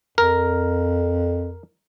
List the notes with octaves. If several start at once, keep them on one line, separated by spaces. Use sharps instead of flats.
F2 A#4